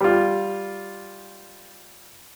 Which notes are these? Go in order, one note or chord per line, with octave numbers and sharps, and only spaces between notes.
G3 F4